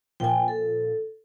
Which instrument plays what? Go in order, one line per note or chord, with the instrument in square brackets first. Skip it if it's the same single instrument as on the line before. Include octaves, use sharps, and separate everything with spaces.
[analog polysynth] A#2 F3 [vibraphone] G5 G#5
[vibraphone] A4